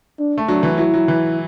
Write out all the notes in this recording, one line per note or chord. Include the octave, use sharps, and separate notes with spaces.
D4
A3
F#3 D4
E3
F#3 E4
F#3
E3